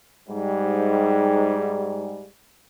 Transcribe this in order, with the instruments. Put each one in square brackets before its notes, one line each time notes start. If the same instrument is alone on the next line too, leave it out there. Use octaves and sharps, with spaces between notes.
[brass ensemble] G#2 G3